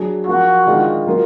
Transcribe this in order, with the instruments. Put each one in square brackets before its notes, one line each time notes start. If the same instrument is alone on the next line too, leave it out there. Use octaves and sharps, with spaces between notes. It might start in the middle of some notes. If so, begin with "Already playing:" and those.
Already playing: [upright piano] F#3 D4 G#4
[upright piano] F3 A#3 F4 [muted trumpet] F#4
[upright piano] D#3 G#3 D4 F4 G#4
F#3 A#3 F4 A#4